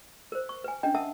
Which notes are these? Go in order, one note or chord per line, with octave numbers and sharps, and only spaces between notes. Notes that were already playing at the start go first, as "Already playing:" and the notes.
A#4 C5
C#6
B4 G#5
C#4 D4 D#5 G5
A#4 E5 F#5 A5 D#6